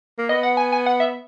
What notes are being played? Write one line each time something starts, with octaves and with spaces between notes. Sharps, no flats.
A#3
B3 D#5
F#5
G#5
G#5
F#5
E5